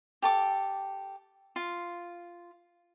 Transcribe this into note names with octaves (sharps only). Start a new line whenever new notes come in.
G4 A4 D6
F4